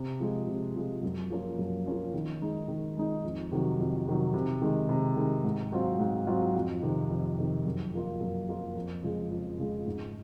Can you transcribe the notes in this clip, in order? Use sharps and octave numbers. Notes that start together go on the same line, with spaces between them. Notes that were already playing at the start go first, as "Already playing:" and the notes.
Already playing: C3
F3 G#3
C3
F3 G#3
F#2
F3 A#3 C#4 F4
F#2
F3 A#3 C#4 F4
D#3
G#3 D#4
D#3
G#3 D#4
F2
C3 D#3 F#3
F2
C3 D#3 F#3
C3
D#3 G#3
C3
D#3 G#3
G#2
F#3 C4 F4
G#2
F#3 C4 F4
F2
C3 D#3
F2
C3 D#3
F#2
F3 A#3 F4
F#2
F3 A#3 F4
F2
C#3 F3 G#3
F2
C#3 F3 G#3
G#2